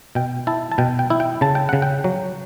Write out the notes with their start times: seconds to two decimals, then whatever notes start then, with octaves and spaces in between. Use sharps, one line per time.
0.15 B2 G5
0.47 E4 A5
0.72 A5
0.78 B2 G5
0.99 G5
1.10 E4
1.20 G5
1.41 C#3 A5
1.55 G5
1.69 C#3 F#5
1.82 G5
2.04 F#3